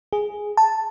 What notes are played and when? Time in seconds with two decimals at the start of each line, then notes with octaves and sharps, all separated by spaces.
0.13 G#4
0.57 A5